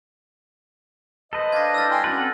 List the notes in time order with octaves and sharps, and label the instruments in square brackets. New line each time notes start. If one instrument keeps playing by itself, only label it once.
[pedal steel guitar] A4 B4 C5 [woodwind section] D#5
[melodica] D4 F5 [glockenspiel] G#6 A#6
[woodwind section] G3 E4 G4 [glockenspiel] E6 F6 A6
[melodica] G5 G#5 C6
[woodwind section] C#4 D4 [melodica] F#4 [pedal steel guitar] B4 F#5
[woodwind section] C4 A4